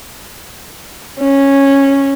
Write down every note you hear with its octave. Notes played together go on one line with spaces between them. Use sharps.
C#4